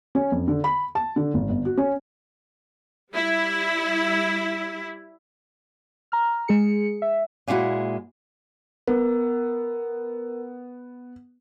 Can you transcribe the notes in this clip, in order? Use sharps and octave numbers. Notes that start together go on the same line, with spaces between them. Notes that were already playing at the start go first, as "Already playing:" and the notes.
C#4
F2
D3
B5
A5
D3
G#1
G1
F#4
C#4
G3 E4
A#5 F6
G#3 G#4 C#7
E5
A#2 G#3 A#3 D4 E4 F#4
B3 A#4